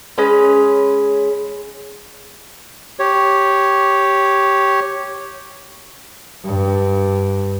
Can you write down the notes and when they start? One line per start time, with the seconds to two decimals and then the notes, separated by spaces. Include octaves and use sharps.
0.18 G#3 C#4 B4
2.99 G4 C#5
6.44 G2